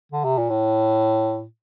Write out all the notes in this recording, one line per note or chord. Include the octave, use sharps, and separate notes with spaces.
D3
C3
A#2
A2